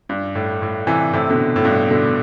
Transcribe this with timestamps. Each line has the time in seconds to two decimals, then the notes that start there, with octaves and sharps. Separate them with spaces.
0.09 G2
0.35 A2
0.62 A2
0.87 C3 E3
1.13 A2 C3
1.30 B2 D3
1.56 A2
1.65 G2 B2
1.91 B2 D3